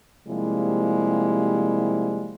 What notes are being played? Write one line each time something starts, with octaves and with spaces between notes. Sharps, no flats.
C3 F3 G3 G#3 A#3 E4